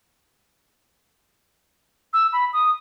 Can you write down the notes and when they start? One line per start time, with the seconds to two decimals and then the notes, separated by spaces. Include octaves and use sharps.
2.13 E6
2.33 B5
2.53 D#6